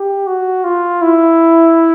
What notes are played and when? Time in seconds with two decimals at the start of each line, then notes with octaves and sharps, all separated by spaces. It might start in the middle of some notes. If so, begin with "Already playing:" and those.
Already playing: G4
0.27 F#4
0.64 F4
1.02 E4